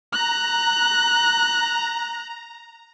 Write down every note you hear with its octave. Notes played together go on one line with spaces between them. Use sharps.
A#5 F#6